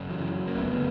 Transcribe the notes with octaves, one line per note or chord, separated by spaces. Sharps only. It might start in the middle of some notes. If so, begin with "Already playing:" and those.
Already playing: F#1 F#2 C#3
E3 F#3
A#3
F#1 F2 D3 A3 B3